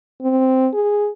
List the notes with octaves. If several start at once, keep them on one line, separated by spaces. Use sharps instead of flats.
C4
G#4